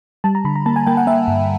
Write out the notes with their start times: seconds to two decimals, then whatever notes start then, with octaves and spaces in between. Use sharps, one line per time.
0.24 G3 A5
0.35 A#5
0.45 D3 B5
0.56 A#5
0.66 A#3 A5
0.76 G#5
0.86 A#3 G5
0.97 F#5
1.07 A#3 E5
1.28 G2